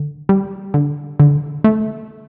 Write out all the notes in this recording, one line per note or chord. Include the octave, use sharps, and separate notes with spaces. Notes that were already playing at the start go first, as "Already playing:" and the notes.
Already playing: D3
G3
D3
D3
A3